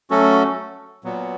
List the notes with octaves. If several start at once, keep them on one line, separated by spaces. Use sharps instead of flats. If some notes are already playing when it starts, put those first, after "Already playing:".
F#3 A3 C#4 F#4 A4
A#2 F#3 B3